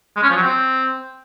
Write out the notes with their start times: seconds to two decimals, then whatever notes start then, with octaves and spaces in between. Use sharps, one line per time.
0.16 G#3
0.23 C#4
0.30 F3
0.36 F#3
0.43 C4